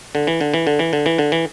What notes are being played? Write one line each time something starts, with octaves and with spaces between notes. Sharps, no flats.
D3
E3
D3
E3
D3
E3
D3
E3
D3
E3